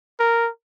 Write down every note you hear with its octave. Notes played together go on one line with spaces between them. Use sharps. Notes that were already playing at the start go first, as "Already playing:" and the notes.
A#4